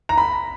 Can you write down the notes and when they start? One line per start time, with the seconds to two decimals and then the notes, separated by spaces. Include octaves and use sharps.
0.09 A#5
0.18 B5